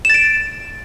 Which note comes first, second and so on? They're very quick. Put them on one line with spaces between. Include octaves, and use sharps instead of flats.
E7 A6 D7